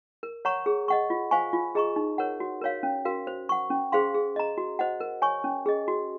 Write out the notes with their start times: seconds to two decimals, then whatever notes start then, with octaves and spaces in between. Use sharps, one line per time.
0.23 A#4
0.45 C#5 F#5 A#5 C#6
0.66 G#4
0.88 D#5 F#5 C#6
1.10 F4
1.31 C5 F5 G#5 C#6
1.53 F4
1.75 G#4 D#5 A#5 C#6
1.96 D#4
2.18 A#4 C#5 F#5
2.40 F#4
2.61 A#4 C#5 F5
2.83 C#4
3.05 F#4 A#4 F5
3.27 C5
3.49 F#5 C#6
3.70 C#4
3.92 G#4 C5 F5 C6
4.14 G#4
4.36 D#5 A#5
4.58 F#4
4.79 C5 D#5 F#5
5.00 A#4
5.22 C#5 G#5 C#6
5.44 C#4
5.66 G#4 D#5
5.88 F#4